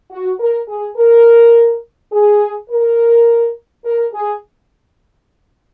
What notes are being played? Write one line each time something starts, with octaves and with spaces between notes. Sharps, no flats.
F#4
A#4
G#4
A#4
G#4
A#4
A#4
G#4